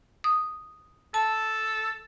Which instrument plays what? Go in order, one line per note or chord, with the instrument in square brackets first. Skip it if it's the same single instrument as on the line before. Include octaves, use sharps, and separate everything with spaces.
[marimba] D#6
[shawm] A4 [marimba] A5